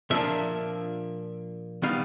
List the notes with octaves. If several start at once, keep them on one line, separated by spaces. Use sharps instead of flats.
A#2 F3 A#3 D4 E5
D#3 G3 B3 D#4 F5